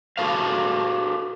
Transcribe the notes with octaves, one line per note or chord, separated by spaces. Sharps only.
F#4 G#4 A4 C5 F5